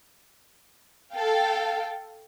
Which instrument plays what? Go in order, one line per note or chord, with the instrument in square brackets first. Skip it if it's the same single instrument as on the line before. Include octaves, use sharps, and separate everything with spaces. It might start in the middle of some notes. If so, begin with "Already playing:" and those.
[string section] A4 F5 G5